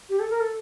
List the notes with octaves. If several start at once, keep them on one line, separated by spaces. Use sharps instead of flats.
G4
A4
A#4
A4